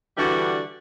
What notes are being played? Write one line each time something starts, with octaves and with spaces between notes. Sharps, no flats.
D3 E3 G3 D4 F#4